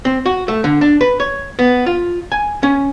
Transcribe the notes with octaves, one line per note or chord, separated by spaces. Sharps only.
C4
F#4
A3
D3
D4
B4
C#5
B3
F4
G#5
C#4